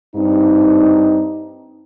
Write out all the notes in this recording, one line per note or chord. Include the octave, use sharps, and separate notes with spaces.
G2 C4 D#4